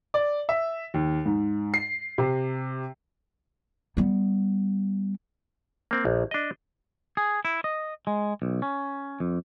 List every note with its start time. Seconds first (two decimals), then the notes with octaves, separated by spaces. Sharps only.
0.14 D5
0.49 E5
0.94 D#2
1.26 G#2
1.74 C7
2.18 C3
3.97 G3 B3
5.91 A#3 C4
6.05 A#1
6.31 D4 D#5
7.17 G#4
7.45 E4
7.64 D#5
8.07 G#3
8.42 B1
8.62 C#4
9.20 F2